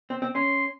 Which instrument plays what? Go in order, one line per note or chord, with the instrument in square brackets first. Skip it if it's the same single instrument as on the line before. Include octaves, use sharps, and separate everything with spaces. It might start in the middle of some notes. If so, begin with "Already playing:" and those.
[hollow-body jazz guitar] C4
C4
[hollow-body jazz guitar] C#4 [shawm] C6